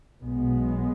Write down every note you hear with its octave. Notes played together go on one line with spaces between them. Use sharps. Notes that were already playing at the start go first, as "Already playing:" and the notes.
B1 B2 G#3 B3